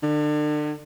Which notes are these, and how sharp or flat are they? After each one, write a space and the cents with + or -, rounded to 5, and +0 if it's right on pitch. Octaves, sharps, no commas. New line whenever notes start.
D3 +35